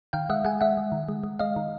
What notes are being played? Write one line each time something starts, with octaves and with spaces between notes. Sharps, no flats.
D#3 F5 G5
G#3 E5 F#5
G#3 F#5 G#5
G#3 E5 F#5
G#3
D#3
G#3
G#3
G#3 D#5 F5
D#3